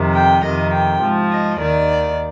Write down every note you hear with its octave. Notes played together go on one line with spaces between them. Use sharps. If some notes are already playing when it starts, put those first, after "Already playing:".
Already playing: F2 C3 D#3
G5
F2 C3 D#3 D#5
G5
G#2 F3
D#5
D#2 D#3 D5